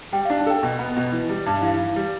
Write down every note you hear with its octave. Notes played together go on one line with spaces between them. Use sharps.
G3 G5
D4 F5
A5
A4 G5
B2 G5
B3
B2
E3
G3
G2
E3 F5
E3
G3